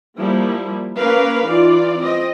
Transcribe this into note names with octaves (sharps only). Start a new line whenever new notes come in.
F3 G3 A#3 E4
A#3 C#4 A#4 B4 F5
E3 D#4 F4 D5
C4 D#5